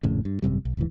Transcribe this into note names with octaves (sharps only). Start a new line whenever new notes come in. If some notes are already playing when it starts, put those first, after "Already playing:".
G#1 F2 A2 C#3
G2
G#1 F#2 C3 G3
B1
D#1 D2 G#2 E3